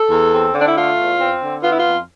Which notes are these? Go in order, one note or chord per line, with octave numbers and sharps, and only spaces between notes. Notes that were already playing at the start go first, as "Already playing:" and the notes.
Already playing: A4
E2
C4
D3
D4
E4
A3 F4
E2
C4
D3
B3 F4
E4
F4
F2